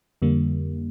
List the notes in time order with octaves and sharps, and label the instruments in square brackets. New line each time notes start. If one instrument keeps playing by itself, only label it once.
[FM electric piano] F2 D3 G3 A#3